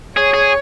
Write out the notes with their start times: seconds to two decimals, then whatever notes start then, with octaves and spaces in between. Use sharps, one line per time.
0.17 G#4 C#5
0.34 G#4